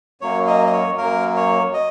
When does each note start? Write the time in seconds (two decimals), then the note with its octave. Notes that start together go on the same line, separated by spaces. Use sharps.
0.21 F#2 F#3 A#3 C#5
0.47 D#5
0.66 D#5
0.73 C#5
0.98 F#2 F#3 A#3 A#4
1.36 C#5
1.74 D#5